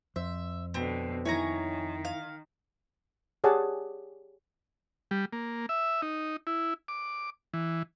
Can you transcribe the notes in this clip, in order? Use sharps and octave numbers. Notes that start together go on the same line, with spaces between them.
F2 C5 E5
B2 D3 B3 C4
D#3 E4 C#5 G#5 A#5
F5
G4 G#4 C#5 D5 F#5 A5
G3
A#3
E5
D#4
E4
D6
E3